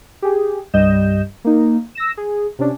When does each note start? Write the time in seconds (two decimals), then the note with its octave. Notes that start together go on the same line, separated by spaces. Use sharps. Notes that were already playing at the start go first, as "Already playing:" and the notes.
0.22 G4 G#4
0.74 C2 G2 G3 D#5 G6 E7
1.44 A#3 D#4
1.95 E6 A#6 E7
2.17 G#4
2.59 C3 C#4 D4